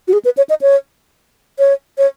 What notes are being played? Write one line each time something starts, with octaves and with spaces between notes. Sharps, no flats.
F#4
G#4
B4
C#5
D#5
C#5
C#5
C#5